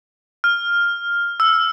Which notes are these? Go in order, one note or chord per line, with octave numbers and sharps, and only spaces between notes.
F6
E6